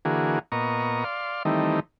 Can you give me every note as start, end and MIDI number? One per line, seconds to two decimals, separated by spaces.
0.05 0.39 50
0.05 0.39 52
0.05 0.39 58
0.05 0.39 66
0.05 0.39 68
0.52 1.04 46
0.52 1.04 59
0.52 1.04 75
0.52 1.04 82
0.52 1.04 85
1.04 1.43 74
1.04 1.43 77
1.04 1.43 84
1.45 1.80 51
1.45 1.80 52
1.45 1.80 55
1.45 1.80 57
1.45 1.80 60
1.45 1.80 63